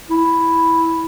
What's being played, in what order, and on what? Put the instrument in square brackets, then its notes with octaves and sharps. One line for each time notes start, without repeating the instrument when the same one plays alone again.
[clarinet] E4